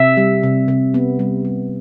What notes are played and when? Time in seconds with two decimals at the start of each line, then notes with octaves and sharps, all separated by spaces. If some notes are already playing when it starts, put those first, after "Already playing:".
Already playing: C3 E5
0.17 G3
0.43 C3
0.68 C3
0.94 B3
1.19 G3
1.45 G3